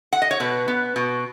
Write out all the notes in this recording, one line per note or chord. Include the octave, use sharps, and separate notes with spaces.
F#5
D#5
C#5
B2 B4
B3
B2